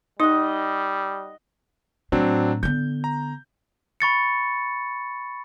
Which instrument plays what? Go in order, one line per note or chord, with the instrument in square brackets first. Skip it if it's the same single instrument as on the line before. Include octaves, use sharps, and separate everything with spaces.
[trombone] G3 [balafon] D#4 [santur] D#5 F#5
[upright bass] A2 [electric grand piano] F#3 C4 D4
[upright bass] D3 B3 [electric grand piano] G6
[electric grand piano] A#5
[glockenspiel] B5 C#6 A6 C#7